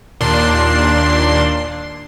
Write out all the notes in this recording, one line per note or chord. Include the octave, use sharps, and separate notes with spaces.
D#2 A#2 D4 C6